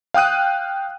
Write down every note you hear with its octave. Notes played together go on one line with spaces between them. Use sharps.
F5 G5 D#6 F#6 D#7